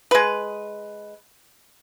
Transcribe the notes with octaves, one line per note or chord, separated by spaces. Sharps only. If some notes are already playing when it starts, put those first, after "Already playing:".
G#3 B4